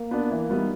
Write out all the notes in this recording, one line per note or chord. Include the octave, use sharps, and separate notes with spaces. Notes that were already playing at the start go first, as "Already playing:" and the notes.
Already playing: A#3
B3 D4
E3
G3 B3 D#4